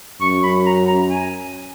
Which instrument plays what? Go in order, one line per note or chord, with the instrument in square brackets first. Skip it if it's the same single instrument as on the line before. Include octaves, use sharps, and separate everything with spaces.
[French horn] F#2 [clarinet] C#6
[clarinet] B5
A#5
A#5
G#5